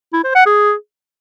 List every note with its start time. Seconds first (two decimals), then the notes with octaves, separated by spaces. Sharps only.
0.13 E4
0.24 C5
0.35 F#5
0.46 G#4